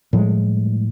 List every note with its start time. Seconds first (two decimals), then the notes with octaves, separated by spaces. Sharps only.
0.13 A2 F3 G3 G#3